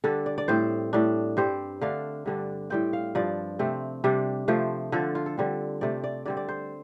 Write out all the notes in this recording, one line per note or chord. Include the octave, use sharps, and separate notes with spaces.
D3 G3 D4 A4
D5
D5
A2 G3 C4 C5
A2 G3 D4
G2 G3 C4 C5
D3 A3 D4 F5
G2 D3 G3 D4
A2 G3 C4 G5
F5
G2 F3 D4 D5
C3 A3 C4
C3 G3 D4
C3 F3 A3 C5
D3 F3 D4 A4
F4
A4
D3 G3 C4
C3 A3 C4 D5
D5
D3 G3 C4 D5
D5
C5